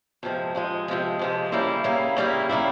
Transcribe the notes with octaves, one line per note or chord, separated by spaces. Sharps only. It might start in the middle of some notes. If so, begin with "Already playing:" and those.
F2 C3 F3 G#3
F2 C3 F3 G#3
F2 C3 F3 G#3
F2 C3 F3 G#3
C#3 G3 A#3 E4
C#3 G3 A#3 E4
C#3 G3 A#3 E4
C#3 G3 A#3 E4